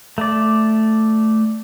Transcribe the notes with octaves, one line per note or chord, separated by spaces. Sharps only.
A3 D5